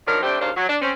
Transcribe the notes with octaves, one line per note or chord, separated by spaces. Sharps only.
F3 F#3 D4 D#4 A#4
G3 A3 C4 D4 G4
D#2 C#3 D4 C5 F5
F#3
D4
C4 C#4